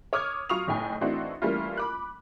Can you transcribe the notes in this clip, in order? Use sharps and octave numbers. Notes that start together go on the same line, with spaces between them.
C#5 D6 D#6 F6 G#6
F#3 F4 C#6 D#6 F7
F#1 A2 D#4 G5 G#5
E3 A3 C4 D4 D#4 F#4
E3 G3 A3 A#3 C#4 F4
B5 D6 F#6